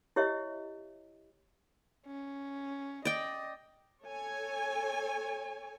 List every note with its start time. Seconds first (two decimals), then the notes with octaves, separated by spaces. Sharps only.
0.16 E4 G4 C#5 D#5 E5
2.07 C#4
3.05 D5 D#5 G5
4.03 A4 C#5 G#5